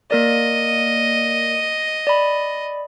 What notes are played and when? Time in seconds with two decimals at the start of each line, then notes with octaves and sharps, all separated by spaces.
0.11 A#3 A#4 D5 D#5
2.07 D5 B5